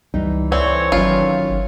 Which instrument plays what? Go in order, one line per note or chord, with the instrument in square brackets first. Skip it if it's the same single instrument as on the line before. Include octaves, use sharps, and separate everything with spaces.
[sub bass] C#2 [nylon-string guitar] E3 G3 D#4
[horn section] A2 E3 C#5 [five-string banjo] C4 [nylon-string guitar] D5
[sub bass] G1 [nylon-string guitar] D#3 F#3 C#4 [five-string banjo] F4